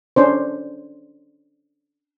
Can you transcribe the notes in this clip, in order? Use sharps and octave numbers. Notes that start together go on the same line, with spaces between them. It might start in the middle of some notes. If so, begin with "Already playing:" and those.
C#4 D4 C5